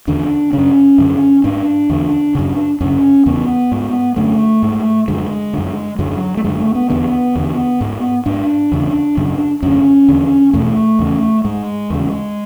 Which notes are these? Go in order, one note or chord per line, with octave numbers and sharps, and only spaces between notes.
E2 D3 D4
F#2 C#3 C#4
F#2 D3
G#2 D4
E2 D3
F#2 C#3
F#2 C#3 C#4
E2 C#3 B3
G#2
F#2 D3 A3
G#2
F#2 D3 G#3
F#2 D3
F#2 D3 F#3
A3
F#2 D3 G#3
A3
B3
E2 D3 B3
E2 D3
G#2
G#2 D4
E2 C#3
F#2 C#3
F#2 D3 C#4
E2 D3
E2 B2 A3
E2 C#3
G#2 G#3
E2 C#3